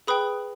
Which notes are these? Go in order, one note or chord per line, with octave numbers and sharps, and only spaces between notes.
G#4 B4 G5 B5 D#6